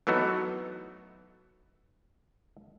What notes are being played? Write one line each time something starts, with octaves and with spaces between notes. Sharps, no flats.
E3 F#3 A3 B3 D#4 F#4